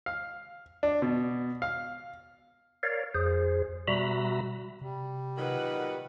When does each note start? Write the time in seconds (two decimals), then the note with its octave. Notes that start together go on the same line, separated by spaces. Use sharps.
0.06 F5
0.83 D4
1.02 B2
1.62 F5
2.83 A#4 C#5 D5 F5
3.14 F2 G#4 C5
3.88 B2 G3 F#4 E5 A#5 B5
4.81 C3 G3
5.38 A#2 D#3 F#3 B4 F#5